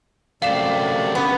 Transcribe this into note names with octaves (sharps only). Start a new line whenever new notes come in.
F#2 C3 A3 G4 D5 F5 C7 E7
B3 C#4 G4